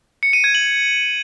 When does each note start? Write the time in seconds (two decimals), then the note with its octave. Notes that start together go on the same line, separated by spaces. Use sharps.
0.23 C#7
0.33 D#7
0.44 G#6
0.55 F#7